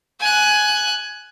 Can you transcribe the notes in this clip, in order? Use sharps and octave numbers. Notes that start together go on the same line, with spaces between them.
G#5 F#6